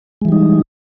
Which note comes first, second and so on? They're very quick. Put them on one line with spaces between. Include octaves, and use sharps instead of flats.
G#3 E3 G3 D#4